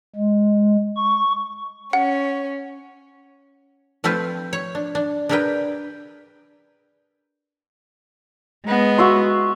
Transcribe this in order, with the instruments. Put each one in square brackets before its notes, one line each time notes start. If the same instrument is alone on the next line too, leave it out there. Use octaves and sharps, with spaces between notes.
[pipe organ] G#3
C#6
[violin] C#4 [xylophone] F#5
[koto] F3 A3 C4 F4 B4 C5
C#5
D4
D4
D4 G4 G#4 A#4 B4 G5
[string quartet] G#3 B3
[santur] F#4 E5 C6